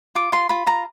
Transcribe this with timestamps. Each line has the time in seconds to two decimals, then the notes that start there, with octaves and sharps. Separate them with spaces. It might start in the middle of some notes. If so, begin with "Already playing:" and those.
0.15 F4 D6
0.32 F4 C6
0.49 F4 B5
0.66 F4 A#5